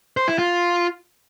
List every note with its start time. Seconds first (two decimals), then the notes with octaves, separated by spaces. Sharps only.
0.17 C5
0.28 E4
0.39 F4